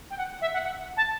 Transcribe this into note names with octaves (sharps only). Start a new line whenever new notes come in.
G5
F#5
E5
F#5
F#5
A5